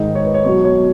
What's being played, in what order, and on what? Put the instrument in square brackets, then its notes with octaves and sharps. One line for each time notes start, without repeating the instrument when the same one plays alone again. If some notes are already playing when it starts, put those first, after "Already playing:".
Already playing: [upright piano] G#2 D#3 G#3 D#4
C#5
B4
C#5
B2 F#3 C#5
C#5